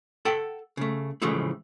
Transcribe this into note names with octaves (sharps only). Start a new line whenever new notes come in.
A4 F#5 G5
C#3 A3
A2 C#3 E3 F3 G#3 A3